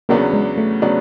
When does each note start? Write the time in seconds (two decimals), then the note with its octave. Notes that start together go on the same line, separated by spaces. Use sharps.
0.09 E2 C#3 F#3 A#3 B3 D4
0.33 G#3
0.58 A3
0.82 C#3 F#3 B3 D4